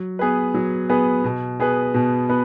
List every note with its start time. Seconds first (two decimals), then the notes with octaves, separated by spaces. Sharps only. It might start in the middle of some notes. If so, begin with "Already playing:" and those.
Already playing: F#3
0.19 B3 G#4 B4
0.54 F#3
0.89 B3 G#4 B4
1.24 B2
1.60 B3 G#4 B4
1.94 B2
2.29 B3 B4